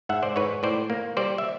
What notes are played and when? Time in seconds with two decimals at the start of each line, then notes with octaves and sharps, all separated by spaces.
0.09 G#2 E5 F#5
0.23 C5 D5
0.36 G#2 B4 C#5
0.63 A2 C5 D5
0.90 A#3
1.17 G3 C5 D5
1.38 E5